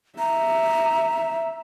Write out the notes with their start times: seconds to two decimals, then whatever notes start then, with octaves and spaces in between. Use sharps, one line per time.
0.19 E5 A#5